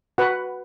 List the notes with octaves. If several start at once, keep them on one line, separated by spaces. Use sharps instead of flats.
F#4 B4 F#5